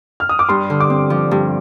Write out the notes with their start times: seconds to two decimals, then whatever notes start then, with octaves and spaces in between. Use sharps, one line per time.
0.20 F6
0.29 D#6
0.39 D6
0.49 G2 C6
0.70 D3
0.80 D6
0.90 C4
1.10 F3
1.31 G2